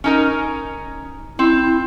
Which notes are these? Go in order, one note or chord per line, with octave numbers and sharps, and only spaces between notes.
C#4 D#4 A#4
C4 E4